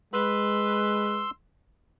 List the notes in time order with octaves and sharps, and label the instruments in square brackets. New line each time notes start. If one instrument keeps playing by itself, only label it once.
[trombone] G#3 [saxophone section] B4 [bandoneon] C6 E6